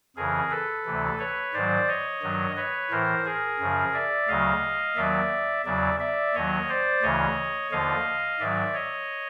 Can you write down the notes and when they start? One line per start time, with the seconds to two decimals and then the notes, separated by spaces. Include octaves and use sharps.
0.16 F2 C#3 E3 G#4 A#4
0.50 A4 B4
0.85 D2 C3 E3
1.19 B4 C#5
1.54 G#2 D#3 F#3 C5 D5
1.88 C#5 D#5
2.22 G2 D#3 F#3
2.56 B4 C#5
2.90 A2 E3 A#4 C5
3.25 G#4 A#4
3.59 F#2 C#3 F3
3.93 D5 E5
4.28 D2 C#3 F#3 D#5 F5
4.96 D#2 D#3 F#3 D5 E5
5.65 E2 C#3 F#3 D5 E5
6.00 D5 E5
6.34 D#2 D#3 F#3 C#5 D#5
6.69 C5 D5
7.02 D2 C#3 E3 C#5 D#5
7.71 D#2 D3 F3 D#5 F5
8.39 G#2 D#3 F#3 D5 E5
8.74 C#5 D#5